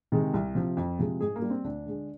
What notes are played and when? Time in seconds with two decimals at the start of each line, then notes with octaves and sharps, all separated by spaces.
0.12 C3 D#3 G#3
0.34 C2
0.55 C3 F3
0.77 F2
0.99 C3 F3 G#3
1.20 G#2 G#4
1.36 A#3
1.42 G3
1.50 C4
1.64 D2 D4
1.86 D3 G#3